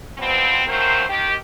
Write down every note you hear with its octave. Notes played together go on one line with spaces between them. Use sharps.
B2 F3 G3 B3 C4
F3 F#3 A3 C4 A#4 C5
D#3 G4